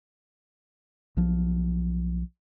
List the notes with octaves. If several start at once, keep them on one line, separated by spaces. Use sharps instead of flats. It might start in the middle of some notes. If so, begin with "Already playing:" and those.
B1 F3